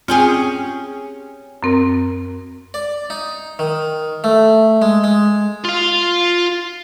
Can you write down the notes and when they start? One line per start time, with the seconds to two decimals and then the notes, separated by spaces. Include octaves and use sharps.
0.08 C4 C#4 F4 G4 G#4
1.63 F#2 C4 A#4
2.74 D5
3.10 D#4
3.59 D#3
4.24 A3
4.82 G#3
5.04 G#3
5.64 F4 F5